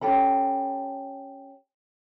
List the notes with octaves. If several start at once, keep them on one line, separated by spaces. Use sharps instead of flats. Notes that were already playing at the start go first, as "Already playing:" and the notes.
C#4 G4 A4 B5